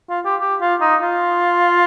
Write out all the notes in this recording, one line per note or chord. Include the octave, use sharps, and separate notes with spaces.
F4
G4
G4
F4
D#4
F4